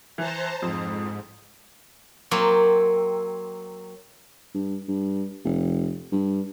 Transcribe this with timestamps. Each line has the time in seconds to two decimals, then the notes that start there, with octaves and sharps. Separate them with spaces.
0.18 E3 C5 A5 A#5
0.62 F2 G#2
2.31 F#3 A#3 C4
4.54 G2
4.88 G2
5.44 F1
6.12 G2